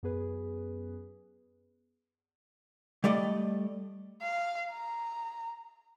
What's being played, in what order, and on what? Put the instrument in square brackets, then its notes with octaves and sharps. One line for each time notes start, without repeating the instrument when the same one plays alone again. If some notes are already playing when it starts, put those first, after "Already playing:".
[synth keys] F#2 B3 G#4 B4
[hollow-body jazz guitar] G3 A3 D5 D#5
[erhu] F5
A#5